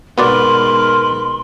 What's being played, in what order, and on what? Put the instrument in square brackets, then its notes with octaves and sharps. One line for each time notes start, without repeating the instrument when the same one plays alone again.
[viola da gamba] G#2 B2 B4 [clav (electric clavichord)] B3 F#4 D5 [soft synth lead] A#4 [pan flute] C6